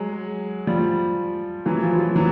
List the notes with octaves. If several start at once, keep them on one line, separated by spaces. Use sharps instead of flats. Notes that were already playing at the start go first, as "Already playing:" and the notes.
Already playing: F#3 G#3
F3 G3
E3 F#3
F3
F3
E3 F#3